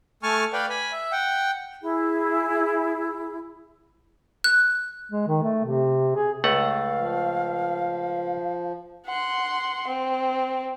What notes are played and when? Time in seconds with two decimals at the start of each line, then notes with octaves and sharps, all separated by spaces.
0.23 A3 G#5 A5 C#6 F6
0.53 B4 D5 F5 G5
0.69 G#5 B5
0.92 E5
1.12 F#5 G5
1.82 E4 G#4
4.44 F#6
5.12 G#3
5.28 D#3
5.43 A3
5.65 C3
6.15 G#4
6.44 C#2 A3 F5 F#5
6.96 F3
9.06 F#5 C6
9.88 C4